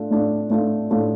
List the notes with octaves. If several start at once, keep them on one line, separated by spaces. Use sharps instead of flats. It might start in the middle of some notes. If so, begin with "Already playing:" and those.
Already playing: A2 A3 D4 F4
A2 A3 D4 F4
A2 A3 D4 F4
A2 A3 D4 F4